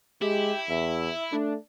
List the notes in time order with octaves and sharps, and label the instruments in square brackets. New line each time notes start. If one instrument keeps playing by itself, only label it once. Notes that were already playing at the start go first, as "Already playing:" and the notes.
[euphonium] G#3 [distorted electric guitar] E4 [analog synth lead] G4
[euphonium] E2 [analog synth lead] E5
[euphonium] A3 [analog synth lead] D4